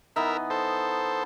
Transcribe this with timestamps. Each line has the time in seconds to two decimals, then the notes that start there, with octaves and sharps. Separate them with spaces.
0.16 E3 B3 D#4 A#4 E5
0.50 A4 C5